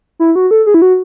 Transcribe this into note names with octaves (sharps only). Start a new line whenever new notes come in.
E4
F#4
A4
G#4
E4
F#4